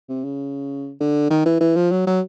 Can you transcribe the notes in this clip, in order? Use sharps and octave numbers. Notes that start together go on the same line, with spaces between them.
C3
C#3
D3
D#3
E3
E3
F3
F#3
F#3